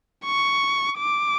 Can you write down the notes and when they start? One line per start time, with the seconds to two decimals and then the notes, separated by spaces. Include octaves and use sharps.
0.25 C#6
0.98 D6